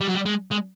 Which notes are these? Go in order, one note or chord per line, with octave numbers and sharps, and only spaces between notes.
G3
F#3
G3
G#3
G#3